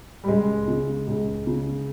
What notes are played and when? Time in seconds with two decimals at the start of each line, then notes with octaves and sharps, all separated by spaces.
0.24 G3
0.28 C#2 G#3
0.68 C#3
1.07 C#2
1.47 C#3